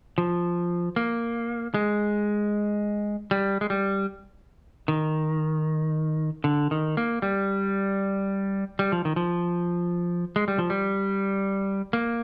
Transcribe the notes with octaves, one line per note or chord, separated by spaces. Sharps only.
F3
A#3
G#3
G3
G#3
G3
D#3
D3
D#3
A#3
G3
G3
F3
D#3
F3
G#3
G3
F3
G3
A#3